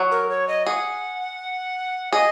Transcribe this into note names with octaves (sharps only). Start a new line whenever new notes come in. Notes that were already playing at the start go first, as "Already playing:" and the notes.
Already playing: F#3
A#4
C#5
D#5
G#4 F#5
G#4 D#5